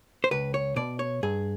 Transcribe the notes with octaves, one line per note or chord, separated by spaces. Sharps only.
C5
C#2 B4
C#5
B2 D5
C#5
G2 G#4